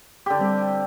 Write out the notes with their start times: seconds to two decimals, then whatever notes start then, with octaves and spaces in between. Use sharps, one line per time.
0.26 D3 G4
0.39 G3 C4 D4